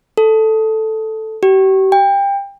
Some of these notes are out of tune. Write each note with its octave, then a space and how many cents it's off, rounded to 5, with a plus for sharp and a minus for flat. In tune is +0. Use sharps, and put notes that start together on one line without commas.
A4 +0
G4 -40
G5 +25